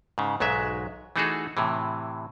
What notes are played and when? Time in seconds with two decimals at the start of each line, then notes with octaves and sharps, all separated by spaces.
0.18 G#2 C#3
0.40 B1 G#2 F#3 G#3 E5
1.16 E3 A3 D#4 F#4 G#4 A4
1.57 A2 C3 E3